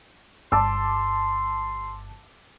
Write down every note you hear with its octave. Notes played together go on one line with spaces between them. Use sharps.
G1 G2 A5 C6 D6 E6